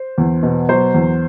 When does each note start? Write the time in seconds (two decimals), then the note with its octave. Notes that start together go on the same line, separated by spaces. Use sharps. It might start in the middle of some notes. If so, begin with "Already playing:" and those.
Already playing: C5
0.18 E2
0.43 B2
0.69 F#3 C5
0.94 E2